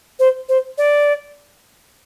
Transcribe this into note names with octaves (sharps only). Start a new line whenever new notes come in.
C5
C5
D5